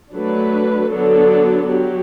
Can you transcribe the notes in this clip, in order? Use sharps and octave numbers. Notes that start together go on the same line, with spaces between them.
F#3 A3 D4 B4
D3 F#3 B3 D4 A4
F#3 G4